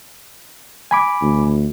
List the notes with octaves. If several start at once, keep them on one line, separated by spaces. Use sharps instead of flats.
G#5 B5 D6
D2